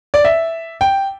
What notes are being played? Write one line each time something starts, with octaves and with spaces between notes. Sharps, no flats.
D5
E5
G5